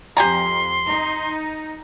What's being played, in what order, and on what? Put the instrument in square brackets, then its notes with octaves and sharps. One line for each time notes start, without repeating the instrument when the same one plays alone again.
[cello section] F2 [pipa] G4 G#5 A#5 [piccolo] C6
[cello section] D#4